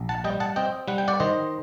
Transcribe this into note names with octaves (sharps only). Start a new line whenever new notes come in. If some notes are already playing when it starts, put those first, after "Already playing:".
Already playing: A#1
F#5 A5
G3 D#5 G5
F#5 A5
C4 D#5 G5
G3 F#5
G5
D5 F#5
D#3 C5 D#5